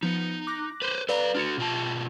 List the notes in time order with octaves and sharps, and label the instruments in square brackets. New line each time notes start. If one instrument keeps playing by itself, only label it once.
[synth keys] F3 B3 C#7 [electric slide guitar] D#4
[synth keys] D6 F#6 A#6
[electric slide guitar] B4 C5
[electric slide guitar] A4 F5 [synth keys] B4 D5 A#5
[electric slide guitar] D4 F#4 [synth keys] F6 C#7
[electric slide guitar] B2 F4 A5